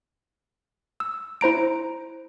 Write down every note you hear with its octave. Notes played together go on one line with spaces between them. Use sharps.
E6
E4 C5 A#5 D7